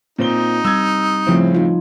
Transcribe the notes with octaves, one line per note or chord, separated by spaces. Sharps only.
A#2 C4 D#4 G7
G3 C4 E6 G#6
A2 C#3 F3 C4 E4
D#4 F4